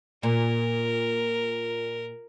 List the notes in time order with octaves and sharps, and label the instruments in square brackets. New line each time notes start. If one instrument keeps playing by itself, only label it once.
[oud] A#2 [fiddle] A#4